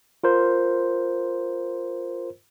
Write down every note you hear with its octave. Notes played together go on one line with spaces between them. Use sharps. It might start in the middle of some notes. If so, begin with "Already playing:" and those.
F4 A#4 C5